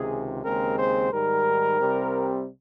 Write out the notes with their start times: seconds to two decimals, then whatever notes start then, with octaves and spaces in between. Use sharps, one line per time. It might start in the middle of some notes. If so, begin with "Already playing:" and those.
Already playing: C#2 C3 D#3 G#4
0.43 D#2 C#3 G#3 C4 A#4
0.77 C5
1.11 G#2 D#3 G3 A#4
1.80 C2 C3 G3 C4